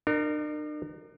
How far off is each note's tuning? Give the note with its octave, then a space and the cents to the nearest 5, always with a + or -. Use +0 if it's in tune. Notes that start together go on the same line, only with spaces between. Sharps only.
D4 +45 A#4 -15